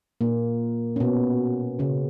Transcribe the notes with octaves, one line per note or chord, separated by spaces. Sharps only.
A#2 A#3
C#4
B2 B3
C#3 C#4